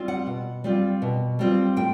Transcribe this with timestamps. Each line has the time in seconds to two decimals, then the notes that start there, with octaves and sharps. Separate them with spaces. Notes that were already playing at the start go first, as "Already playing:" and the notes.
Already playing: G3 C4 F4
0.08 F#5
0.26 B2
0.64 G3 C4 F4
1.02 B2
1.39 G3 C4 F4
1.77 A2 G5